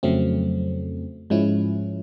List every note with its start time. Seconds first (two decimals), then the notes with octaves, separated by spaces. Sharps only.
0.03 F2 C#3 F#3 A3 C4
1.30 G#2 F3 G#3 C#4 E4